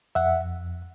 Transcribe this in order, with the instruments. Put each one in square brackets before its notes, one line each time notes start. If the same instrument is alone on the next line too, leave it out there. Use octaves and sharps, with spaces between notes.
[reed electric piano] F2 E5 F#5